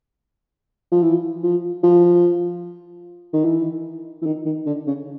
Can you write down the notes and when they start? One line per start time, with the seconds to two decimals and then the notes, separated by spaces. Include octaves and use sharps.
0.92 F3
1.02 E3
1.43 F3
1.83 F3
3.33 D#3
3.45 E3
4.22 E3
4.26 D#3
4.46 D#3
4.66 D3
4.87 C#3